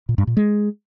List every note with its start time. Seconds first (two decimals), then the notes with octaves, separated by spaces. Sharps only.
0.09 A#2
0.18 G2
0.27 A#2
0.37 G#3